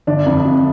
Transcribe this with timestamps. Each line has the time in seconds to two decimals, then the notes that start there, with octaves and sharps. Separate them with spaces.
0.07 G1 D4
0.26 F2
0.45 C3